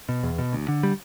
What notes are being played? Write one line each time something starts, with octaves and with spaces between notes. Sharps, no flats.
B2
E2
B2
D2
D3
G3